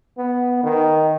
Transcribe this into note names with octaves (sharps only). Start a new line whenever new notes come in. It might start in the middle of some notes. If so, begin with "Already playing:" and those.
B3
D#3